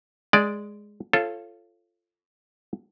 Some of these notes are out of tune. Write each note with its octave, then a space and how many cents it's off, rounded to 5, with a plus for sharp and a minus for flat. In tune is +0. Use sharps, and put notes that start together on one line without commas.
G#3 +0 D5 +0
F4 -15 A4 +0 C#5 -30